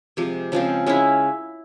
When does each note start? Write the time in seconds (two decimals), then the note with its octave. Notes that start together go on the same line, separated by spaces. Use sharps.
0.17 C3 F3 G#3
0.52 C#3 F3 G#3 C4
0.86 G#3 C#4 E4